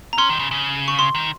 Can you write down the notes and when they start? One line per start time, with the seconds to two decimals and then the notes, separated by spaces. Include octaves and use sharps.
0.13 A#5
0.18 C#4 C6
0.30 D#3
0.39 C#3
0.51 C#3
0.88 C#6
0.99 C6
1.15 D#3